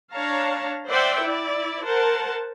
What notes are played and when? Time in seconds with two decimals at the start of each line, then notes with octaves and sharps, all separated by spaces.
0.13 D4 C#5 F5 A5 A#5
0.89 C5 D5 E5 F#5 G5
1.23 E4 D5
1.84 A#4 C5 F#5 A5